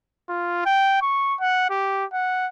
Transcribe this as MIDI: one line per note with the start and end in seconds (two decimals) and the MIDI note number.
0.29 0.62 65
0.66 0.97 79
1.02 1.35 85
1.40 1.69 78
1.70 2.05 67
2.13 2.48 78